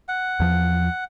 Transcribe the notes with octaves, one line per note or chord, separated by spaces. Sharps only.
F#5
E2 F3